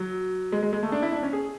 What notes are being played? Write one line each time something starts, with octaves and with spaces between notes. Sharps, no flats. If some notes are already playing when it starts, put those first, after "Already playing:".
Already playing: F#3
G#3
G#3
G#3
A3
D4
E4
D4
C#4
G#4